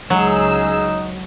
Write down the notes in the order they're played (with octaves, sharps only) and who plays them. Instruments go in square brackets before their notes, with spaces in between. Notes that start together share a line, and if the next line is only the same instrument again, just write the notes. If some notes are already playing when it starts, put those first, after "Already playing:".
[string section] C#2 E6 [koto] F#3 [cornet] D#4 [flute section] G#4